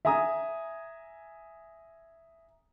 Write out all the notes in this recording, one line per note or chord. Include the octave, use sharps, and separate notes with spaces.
E5 G#5 A#5 D#6